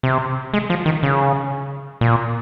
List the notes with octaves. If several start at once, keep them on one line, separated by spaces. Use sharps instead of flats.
C3
G#3
F3
D#3
C#3
A#2